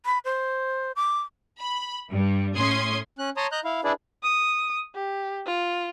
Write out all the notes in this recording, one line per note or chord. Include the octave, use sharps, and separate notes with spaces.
B5
C5
D6
B5
G2 G3
A2 C#4 C6 D#6 G#6
C#4 F#6
C#5 A5 A#5 C6 D#6
D#5 A#5 F#6 G6
E4 F5
D4 E4 G#4 B4 D5
D#6
G4
F4